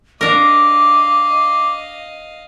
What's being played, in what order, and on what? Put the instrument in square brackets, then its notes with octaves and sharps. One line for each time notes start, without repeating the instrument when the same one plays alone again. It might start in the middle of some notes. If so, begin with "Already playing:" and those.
[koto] D4 A#4 [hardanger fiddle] D#5 F5 [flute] D6